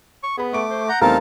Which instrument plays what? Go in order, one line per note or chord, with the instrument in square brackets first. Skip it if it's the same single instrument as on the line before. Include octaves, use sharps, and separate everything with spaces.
[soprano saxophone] C#6
[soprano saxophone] B3 [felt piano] G#4 B5
[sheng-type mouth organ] A3 D6 [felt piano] C#6 D7
[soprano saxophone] C5
[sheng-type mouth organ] F#5 G6 [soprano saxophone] A#5
[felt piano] E2 G3 A3 [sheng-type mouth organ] C4 F5 A5 [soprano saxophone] D#4 [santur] A#4